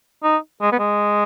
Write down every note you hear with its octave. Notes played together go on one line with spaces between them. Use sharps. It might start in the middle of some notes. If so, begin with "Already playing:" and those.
D#4
G#3
B3
G#3